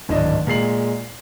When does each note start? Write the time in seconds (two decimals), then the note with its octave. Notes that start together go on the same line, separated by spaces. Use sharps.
0.09 D1 G#1 D4 D#5
0.47 A#2 G#3 C7 F#7